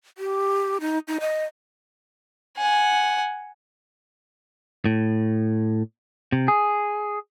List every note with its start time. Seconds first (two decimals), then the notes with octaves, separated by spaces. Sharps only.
0.18 G4
0.81 D#4
1.08 D#4
1.21 D#5
2.58 F#5 G#5
4.85 A2
6.32 C3
6.48 G#4